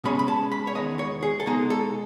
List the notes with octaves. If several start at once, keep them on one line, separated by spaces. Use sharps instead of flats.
B2 G#3 C#4 B5
B5
A5
B5
C#5
E2 D#3 G#3 B3 D#5
C#5
G#4
A4
B2 G#3 D#4 G#4
A4